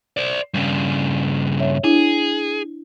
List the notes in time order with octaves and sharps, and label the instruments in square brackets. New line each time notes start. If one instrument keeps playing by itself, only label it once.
[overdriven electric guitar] C5 D5
G2 C#3
[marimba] C#5 E5
[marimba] D4 E4 [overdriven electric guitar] G#4